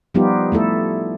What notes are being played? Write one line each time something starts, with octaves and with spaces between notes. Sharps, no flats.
F3 G3 B3 D#4 F4 G4
A3 E4 A4